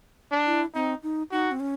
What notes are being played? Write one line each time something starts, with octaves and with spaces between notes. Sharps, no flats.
D4
E4
C4 D#4
D#4
D#4 F#4
C4
C#4